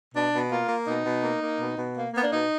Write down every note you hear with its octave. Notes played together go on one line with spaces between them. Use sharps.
B2 D4
B2
A#3 F4
A#3
B2 D#4
B2
A#3
A#3
B2
B2
A#3
A#3 B3
D4
B2 D#4